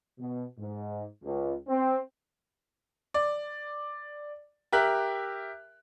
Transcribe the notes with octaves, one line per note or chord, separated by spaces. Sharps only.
B2
G#2
C#2
C4
D5
G4 A#4 E5 F#6